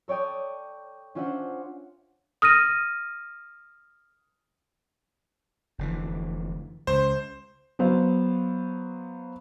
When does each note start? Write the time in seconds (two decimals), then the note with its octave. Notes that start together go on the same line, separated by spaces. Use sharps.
0.08 A4 C#5 D5 G5 D#6
1.15 C#4 D4 F4 C5 E5 F#5
2.42 D#6 F6 A#6 D#7
5.78 F1 D3 E3
6.87 C#2 C5
7.79 F#3 B3 C5 F5